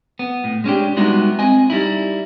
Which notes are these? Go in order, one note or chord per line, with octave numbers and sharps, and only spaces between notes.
B3
A2
G#3 C#4 D4 G4
G3 G#3 B3 D#4 E4 F#4
C4 D#5 G#5
G3 D#4 E4